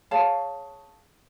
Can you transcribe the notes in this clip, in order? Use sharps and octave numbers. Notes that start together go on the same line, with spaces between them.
G#4 C#5 F5 A5